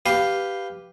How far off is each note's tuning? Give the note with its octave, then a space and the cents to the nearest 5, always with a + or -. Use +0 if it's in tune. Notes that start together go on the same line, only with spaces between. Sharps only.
G4 +0 B4 +0 F5 +0